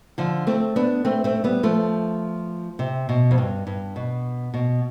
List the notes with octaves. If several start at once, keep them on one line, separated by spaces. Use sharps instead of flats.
D3 F3
A3 C4
B3 D4
A3 C4
A3 C4
G3 B3
F3 A3
C3
B2
F2
G2
G2
B2
B2